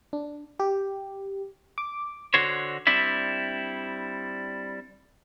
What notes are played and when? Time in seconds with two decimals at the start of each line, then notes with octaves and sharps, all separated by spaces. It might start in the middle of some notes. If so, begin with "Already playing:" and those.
0.13 D4
0.60 G4
1.78 D6
2.34 D3 F#4 C5 C#5
2.87 G3 C4 D4 E4 E5